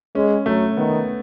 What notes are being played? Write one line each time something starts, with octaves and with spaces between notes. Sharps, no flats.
G#3 C#4
F#3 A3
D#3 B3